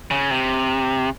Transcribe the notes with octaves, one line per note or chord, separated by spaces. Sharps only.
C#3
C3